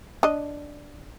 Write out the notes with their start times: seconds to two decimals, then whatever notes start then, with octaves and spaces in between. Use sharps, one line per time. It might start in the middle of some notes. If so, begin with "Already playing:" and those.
0.23 D4 D#5